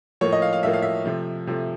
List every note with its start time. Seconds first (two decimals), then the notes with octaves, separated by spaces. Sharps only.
0.21 A2 F3 A#3 C#5
0.32 D#5
0.42 F5
0.53 F5
0.63 A2 F3 A#3 E5
0.73 F5
0.82 E5
1.05 C3 F3 A3
1.47 C3 F3 A3